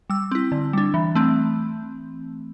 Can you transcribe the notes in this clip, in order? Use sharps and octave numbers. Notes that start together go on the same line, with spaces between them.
G3 E6
C4 E4
D3
G3 D4
E3
A3 C4